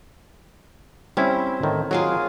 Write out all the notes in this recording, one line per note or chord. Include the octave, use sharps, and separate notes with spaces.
G3 C4 C#4 E4
A2 D#3
F#3 F4 G#4 A#4